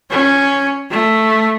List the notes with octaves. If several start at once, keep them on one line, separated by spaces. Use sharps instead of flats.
C#4
A3